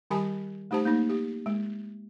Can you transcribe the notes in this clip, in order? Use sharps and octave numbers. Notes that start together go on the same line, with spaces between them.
D#3 G3 G4 G#5 A5 B5
A3 D#4 G4 C5 A5
A#3 D#4
G4
G#3